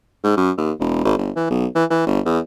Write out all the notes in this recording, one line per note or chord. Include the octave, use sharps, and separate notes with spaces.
G#2
F#2
D#2
E1
G#1
G1
E3
B1
E3
E3
G1
E2